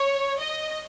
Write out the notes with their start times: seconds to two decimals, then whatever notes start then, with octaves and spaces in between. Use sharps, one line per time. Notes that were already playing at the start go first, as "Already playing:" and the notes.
Already playing: C#5
0.39 D#5